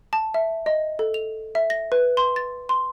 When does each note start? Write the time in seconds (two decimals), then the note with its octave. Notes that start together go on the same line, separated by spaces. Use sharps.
0.13 A5
0.34 E5
0.66 D#5
0.99 A4
1.14 F7
1.55 E5
1.70 A#6
1.92 B4
2.17 C6
2.36 A6
2.69 C6